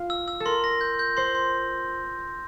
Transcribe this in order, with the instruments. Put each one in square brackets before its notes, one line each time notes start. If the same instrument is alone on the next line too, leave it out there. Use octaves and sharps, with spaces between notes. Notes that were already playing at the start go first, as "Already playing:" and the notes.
Already playing: [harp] F4
[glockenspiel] E6
E6
[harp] A4
[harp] A#4 [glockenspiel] C6
[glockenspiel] A#6
G6
G6
[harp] C5 [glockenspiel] C6
[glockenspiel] C6